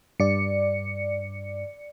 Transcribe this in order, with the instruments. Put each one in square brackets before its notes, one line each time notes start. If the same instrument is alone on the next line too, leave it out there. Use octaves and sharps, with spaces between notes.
[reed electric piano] G2 [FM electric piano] D5 C#7